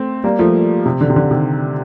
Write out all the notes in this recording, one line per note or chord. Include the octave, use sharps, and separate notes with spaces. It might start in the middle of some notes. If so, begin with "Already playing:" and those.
Already playing: A3 C4
G3 A#3
F3 A3
C3
D3
C3
D3
C3 D#3